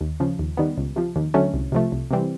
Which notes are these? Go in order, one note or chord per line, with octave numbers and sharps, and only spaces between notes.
D#2
C#3 F3
D#2
D#3 G3 B3
C#2
C3 F3
D#2
D3 F#3 A3 C#4
C2
C3 F3 A3
C2
C3 E3 G3 C4